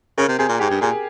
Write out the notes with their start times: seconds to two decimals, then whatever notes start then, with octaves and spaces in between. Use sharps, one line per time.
0.18 C#3 A#4
0.28 C3
0.39 C3 G#4
0.49 A#2
0.60 G#2 G4
0.70 G2
0.81 A#2 G#4